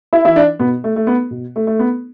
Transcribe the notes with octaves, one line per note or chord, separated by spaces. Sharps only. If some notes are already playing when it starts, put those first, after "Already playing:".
E4
E3 E4
D4
B2 B3
A3
A3
B3
B2
A3
A3
B3